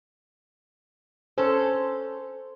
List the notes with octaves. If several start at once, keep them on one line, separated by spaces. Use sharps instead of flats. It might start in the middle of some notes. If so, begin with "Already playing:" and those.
C#4 A4 C5